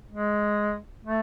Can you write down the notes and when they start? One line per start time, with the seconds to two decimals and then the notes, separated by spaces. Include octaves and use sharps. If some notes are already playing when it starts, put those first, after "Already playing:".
0.11 G#3
1.04 A3